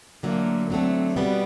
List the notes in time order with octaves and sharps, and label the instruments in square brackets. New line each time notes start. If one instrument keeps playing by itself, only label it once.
[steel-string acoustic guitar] D3 F#3 A3 [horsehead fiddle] A#3
[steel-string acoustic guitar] D3 F#3 A3 [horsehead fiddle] C4
[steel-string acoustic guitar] B2 G3 B3